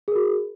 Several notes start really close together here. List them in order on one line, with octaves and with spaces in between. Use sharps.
G#4 A#4 F#4